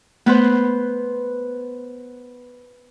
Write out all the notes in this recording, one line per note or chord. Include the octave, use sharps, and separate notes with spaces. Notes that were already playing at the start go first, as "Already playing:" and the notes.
A3 B3 B4 C5